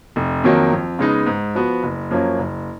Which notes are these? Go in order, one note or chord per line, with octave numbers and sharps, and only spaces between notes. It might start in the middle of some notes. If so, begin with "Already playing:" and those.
F1
F2 D#3 F#3 A#3
F2
C#3 G#3 B3 D#4
G#2
F3 B3 F#4
F#1
F#2 F3 A#3 C#4
F#1